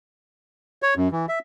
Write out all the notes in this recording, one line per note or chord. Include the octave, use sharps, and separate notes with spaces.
C#5
F#2
E3
E5